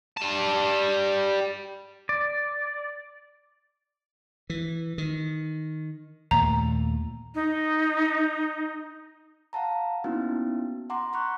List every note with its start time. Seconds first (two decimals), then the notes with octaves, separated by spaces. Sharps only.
0.17 G3 A5
2.09 D5
4.50 E3
4.98 D#3
6.31 D#2 A#2 A3 A#5
7.35 D#4
9.53 F5 F#5 A5 A#5
10.04 A#3 B3 C#4 D#4 E4 F#4
10.90 F#5 A#5 C6 D6
11.13 A#5 B5 C#6 F#6